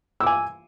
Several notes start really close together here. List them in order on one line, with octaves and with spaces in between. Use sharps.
E6 D6 G#5